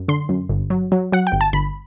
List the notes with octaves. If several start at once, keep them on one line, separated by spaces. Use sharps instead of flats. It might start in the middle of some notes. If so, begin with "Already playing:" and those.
Already playing: F#2
D3 C6
F#2
G1
F#3
F#3
F#3 F#5
G5
G1
A5
G1 B5